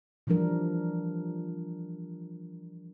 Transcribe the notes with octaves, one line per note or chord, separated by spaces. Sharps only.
E3 F3 G3 D4 A#4